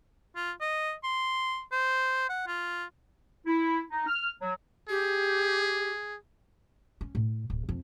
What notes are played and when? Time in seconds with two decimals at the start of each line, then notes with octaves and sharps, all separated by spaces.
0.36 F4
0.61 D#5
1.04 C6
1.72 C5
2.29 F#5
2.47 F4
3.46 E4
3.90 D#4
4.07 F6
4.40 F#3
4.89 G4 G#4
7.01 C#4
7.15 A2
7.50 D1
7.69 F2